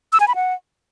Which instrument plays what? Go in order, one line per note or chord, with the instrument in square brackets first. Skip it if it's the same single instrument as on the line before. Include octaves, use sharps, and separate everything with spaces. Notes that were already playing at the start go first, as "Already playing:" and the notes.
[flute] E6
G#5
B5
F#5